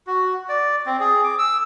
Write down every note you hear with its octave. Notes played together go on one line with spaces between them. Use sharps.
F#4
D5
C4
G#4
D6
E6